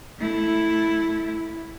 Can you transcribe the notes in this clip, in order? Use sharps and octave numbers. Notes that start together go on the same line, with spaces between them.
A3 E4